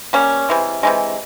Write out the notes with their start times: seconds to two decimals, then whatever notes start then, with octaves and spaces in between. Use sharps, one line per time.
0.13 G3 A#3 C#4
0.49 C3 E3 G#3
0.83 C3 E3 G#3